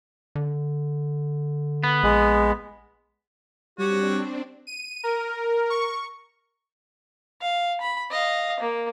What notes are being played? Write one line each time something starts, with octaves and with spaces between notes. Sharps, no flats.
D3
B3
A#1 G#3
G3 C4 D4 F#4 G4 C#5
D#7
A#4
C#6
F5
B5
D#5 F5
A#3